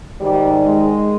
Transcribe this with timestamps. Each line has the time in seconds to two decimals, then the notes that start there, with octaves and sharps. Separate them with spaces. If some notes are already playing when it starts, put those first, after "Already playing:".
0.20 G#2 D#3 G3
0.64 G#3